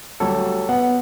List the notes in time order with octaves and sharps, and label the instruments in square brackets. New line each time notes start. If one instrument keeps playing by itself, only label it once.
[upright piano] D2 F#3 G3 [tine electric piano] A4 C#5
[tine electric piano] B3 [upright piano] F#5